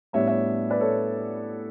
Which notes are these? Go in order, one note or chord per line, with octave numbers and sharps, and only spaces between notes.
A2 G3 B3 D4 C#5 E5
C#5 E5
B4 D5
A4 C#5